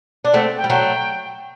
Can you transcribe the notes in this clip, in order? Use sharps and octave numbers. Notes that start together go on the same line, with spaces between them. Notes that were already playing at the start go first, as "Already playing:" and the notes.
D4
A3 C4 F#5
G5
G3
F#3 A3 G5